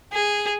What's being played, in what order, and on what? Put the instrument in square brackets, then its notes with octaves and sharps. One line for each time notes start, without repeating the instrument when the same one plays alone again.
[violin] G#4